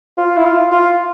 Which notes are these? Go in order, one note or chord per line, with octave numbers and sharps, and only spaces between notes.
F4
E4
F4
F4